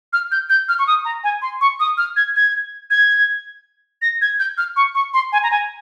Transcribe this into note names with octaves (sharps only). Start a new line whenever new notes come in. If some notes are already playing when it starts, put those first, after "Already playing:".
F6
G6
G6
F6
C#6
D#6
A#5
G#5
C6
C#6
D#6
F6
G#6
G#6
G#6
A#6
G#6
G6
F6
C#6
C#6
C6
G#5
A#5
G#5